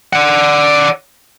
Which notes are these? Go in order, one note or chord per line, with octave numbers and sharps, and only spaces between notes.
D5 F#5